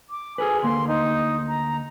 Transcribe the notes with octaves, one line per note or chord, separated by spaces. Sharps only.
D6
G#4 A4 B4 G#5
D2 A#3 C6
D#4
A#5